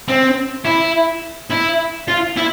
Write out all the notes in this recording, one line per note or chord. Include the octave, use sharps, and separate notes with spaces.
C4
E4
E4
F4
E4